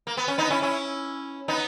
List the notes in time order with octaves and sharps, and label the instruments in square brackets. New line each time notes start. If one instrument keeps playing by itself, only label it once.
[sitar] A#3
B3
C#4
B3 D#4
C#4 E4
C#4 E4
B3 D#4